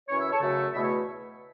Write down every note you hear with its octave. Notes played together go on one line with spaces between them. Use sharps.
F#2 E3 C#4 C#5
E5
A4 C#5
F#2 C#3 A3
E2 B2 A3 E5
C#5